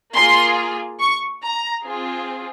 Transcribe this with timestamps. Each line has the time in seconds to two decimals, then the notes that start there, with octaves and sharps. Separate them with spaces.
0.14 A#3 F4 G#4 C6
0.99 C#6
1.42 A#5
1.84 C4 F4 G#4